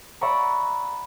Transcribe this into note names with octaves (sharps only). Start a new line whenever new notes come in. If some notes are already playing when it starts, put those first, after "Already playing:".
D5 E5 F#5 A#5 B5 C#6